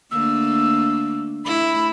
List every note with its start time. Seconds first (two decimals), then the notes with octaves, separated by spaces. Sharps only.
0.11 D3 A3 A#3 E6
1.45 A3 E4 B5